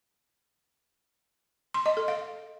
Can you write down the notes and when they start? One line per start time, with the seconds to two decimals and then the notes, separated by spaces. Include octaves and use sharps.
1.74 C6
1.86 D#5
1.97 A4
2.08 F5